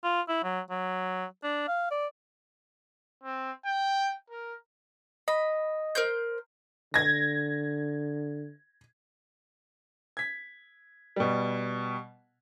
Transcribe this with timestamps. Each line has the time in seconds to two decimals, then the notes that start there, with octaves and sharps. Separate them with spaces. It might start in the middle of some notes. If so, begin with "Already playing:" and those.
0.04 F4
0.28 E4
0.44 F#3
0.70 F#3
1.43 D4
1.68 F5
1.91 D5
3.24 C4
3.65 G5
4.30 A#4
5.28 D#5 B5
5.95 A#4 C5 G6
6.94 D3 G#6 A#6
10.17 G#6 B6
11.16 B2 G3